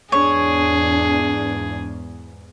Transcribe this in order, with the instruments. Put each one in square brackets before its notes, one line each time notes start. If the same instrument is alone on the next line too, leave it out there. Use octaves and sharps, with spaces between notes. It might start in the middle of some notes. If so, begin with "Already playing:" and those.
[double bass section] E2 G#2 [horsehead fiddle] D4 [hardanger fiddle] G#4 [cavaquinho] C#5